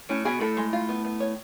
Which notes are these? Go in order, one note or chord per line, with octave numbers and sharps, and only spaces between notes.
A2 C#4
B2 G#4
A2 A4
G#3
F4
B3
B3
C#5